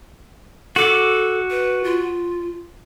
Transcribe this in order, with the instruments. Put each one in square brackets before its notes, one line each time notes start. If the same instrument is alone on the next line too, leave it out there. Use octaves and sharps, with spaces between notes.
[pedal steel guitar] F#4 D6 [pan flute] A4
[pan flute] B4
F4